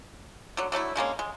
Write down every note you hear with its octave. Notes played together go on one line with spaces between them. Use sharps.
D3 F#3
D3 F#3 A3 E4
D3 G#3 A#3 C#4
G#3